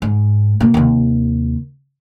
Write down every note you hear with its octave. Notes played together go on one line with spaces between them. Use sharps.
G#2
B2 A#3
D#2 C3